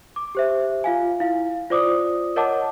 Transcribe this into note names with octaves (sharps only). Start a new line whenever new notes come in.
D6
G4 C5 E5
F4 F5 G#5
E4 F5
F4 C5 D5 D6 D#6
A#4 C#5 D#5 F#5 A5 D6